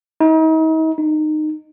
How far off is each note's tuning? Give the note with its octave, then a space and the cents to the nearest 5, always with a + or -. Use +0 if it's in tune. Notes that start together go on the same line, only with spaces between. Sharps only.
D#4 +40
D#4 -20